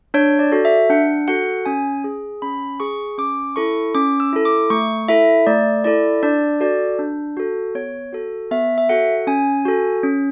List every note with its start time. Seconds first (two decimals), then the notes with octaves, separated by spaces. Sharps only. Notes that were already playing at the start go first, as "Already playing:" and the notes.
0.14 D4 C#5
0.39 D5
0.52 F#4 A4
0.65 E5
0.90 D4 F#5
1.28 F#4 A4 F#5
1.65 C#4 G#5
2.04 G#4
2.42 C#4 B5
2.80 G#4 C#6
3.18 C#4 D6
3.56 E4 A4 C#6
3.95 C#4 D6
4.20 E6
4.33 E4 A4
4.45 D6
4.70 A3 C#6
5.08 E4 A4 E5
5.47 A3 D5
5.84 E4 A4 D5
6.23 D4 D5
6.60 F#4 A4 D5
6.99 D4
7.37 F#4 A4
7.75 B3 C#5
8.13 F#4 A4
8.51 B3 E5
8.78 E5
8.89 F#4 A4 F#5
9.27 C#4 G#5
9.65 F#4 A4
10.03 C#4